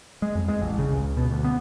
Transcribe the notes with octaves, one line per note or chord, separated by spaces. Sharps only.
G#3
F2
G#3
A1
C#3
C#2
B2
D2
B3